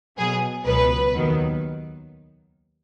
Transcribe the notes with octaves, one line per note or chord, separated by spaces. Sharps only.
B2 F#3 B3 G#4
C#2 B2 F#3 B3 B4
D#2 D#3 F#3 B3